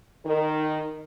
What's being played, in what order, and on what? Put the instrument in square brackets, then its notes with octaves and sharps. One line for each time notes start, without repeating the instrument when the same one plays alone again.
[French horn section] D#3 A#4